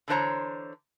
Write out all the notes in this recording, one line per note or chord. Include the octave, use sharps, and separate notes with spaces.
D3 E3 D4 C5 C#5 A#5